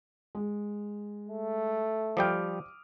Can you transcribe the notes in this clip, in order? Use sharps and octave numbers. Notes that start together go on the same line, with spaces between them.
G#3
A3
F3 G3 G5 D6 D#6 F6